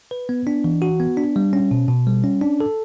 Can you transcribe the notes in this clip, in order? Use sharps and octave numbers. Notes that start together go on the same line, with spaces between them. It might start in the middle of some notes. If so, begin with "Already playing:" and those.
B4
B3
D4
E3
F#4
B3
D4
G3
C#4
B2
B2
G3
C#4
D4
A4